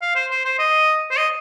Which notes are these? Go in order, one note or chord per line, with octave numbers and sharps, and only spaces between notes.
F5
C5
C5
C5
D#5
C5
D#5